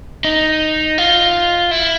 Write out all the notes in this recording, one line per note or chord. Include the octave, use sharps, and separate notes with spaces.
D#4
F4
E4